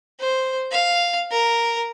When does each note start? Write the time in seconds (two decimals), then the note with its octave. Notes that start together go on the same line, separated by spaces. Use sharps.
0.20 C5
0.72 F5
1.31 A#4